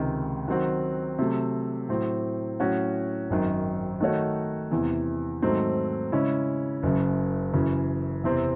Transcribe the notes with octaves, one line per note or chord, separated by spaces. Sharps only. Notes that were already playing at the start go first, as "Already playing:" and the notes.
Already playing: C#2 C3 D#3 G#3
D#3 F#3 C4 F#4
C3 F#3 A3
A2 F#3 C4
A2 F#3 C#4 F#4
G#1 F#2 D#3 F#3
D#3 A3 D#4 F#4 C#5
E2 C3 E3
G#2 D#3 F#3 A3 C4
C#3 G#3 C#4 E4
F#1 F#2 C#3
F#2 C#3 E3
E2 C3 E3 C4